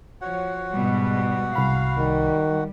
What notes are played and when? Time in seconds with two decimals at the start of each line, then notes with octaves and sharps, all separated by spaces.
0.21 F3 F#4 C#5 F#5
0.73 G#2 B2 G3
1.56 C2 F5 B5
1.97 D#3 G3